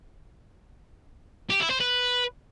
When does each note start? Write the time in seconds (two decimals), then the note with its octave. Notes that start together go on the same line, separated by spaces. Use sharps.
1.50 G4
1.60 E4
1.70 C5
1.80 B4